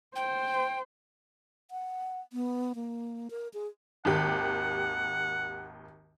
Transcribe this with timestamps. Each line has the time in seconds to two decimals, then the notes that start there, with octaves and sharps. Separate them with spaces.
0.16 C5 G5
1.71 F#5
2.33 B3
2.75 A#3
3.31 A#4
3.54 G#4
4.05 G#1 D#2 G4 F#5